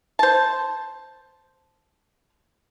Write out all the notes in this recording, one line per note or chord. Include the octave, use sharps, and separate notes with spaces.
C5 A5